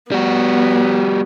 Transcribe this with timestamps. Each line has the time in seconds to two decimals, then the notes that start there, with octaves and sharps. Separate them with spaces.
0.12 G3 B3 F#4